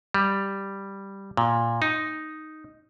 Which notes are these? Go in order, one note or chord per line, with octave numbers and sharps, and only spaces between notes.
G3
A#2
D#4